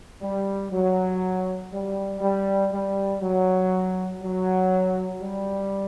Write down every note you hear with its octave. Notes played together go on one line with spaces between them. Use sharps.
G3
F#3
G3
G3
G3
F#3
F#3
G3